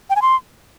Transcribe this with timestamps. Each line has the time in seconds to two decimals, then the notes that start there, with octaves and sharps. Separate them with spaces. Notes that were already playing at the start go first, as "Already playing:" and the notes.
0.10 G5
0.16 G#5
0.22 C6